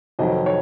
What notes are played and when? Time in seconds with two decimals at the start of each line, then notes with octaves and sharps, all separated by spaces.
0.19 F1 F2 D#3 F#3 D#5
0.46 C#5